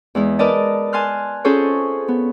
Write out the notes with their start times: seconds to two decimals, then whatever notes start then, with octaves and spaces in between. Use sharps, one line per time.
0.15 E2 G#3 E4
0.39 A#4 B4 D5 D#5 A5
0.93 G#5 A5 C6 F6 F#6
1.45 C#4 F4 G#4 A4 C5 C#5
2.08 B3